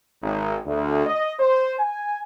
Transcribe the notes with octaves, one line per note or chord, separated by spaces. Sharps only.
G#1
D2
D#5
C5
G#5